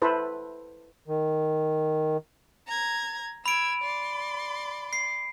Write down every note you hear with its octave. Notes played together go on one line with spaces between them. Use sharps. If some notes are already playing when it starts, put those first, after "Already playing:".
E4 A4 B4 C5
D#3
A#5 G#6
B5 E6 G#6 D7
D5 C6
C7